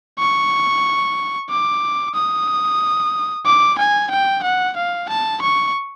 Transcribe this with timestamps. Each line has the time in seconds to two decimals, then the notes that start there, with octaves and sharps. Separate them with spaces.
0.19 C#6
1.50 D6
2.15 D#6
3.46 D6
3.79 G#5
4.11 G5
4.43 F#5
4.77 F5
5.09 A5
5.42 C#6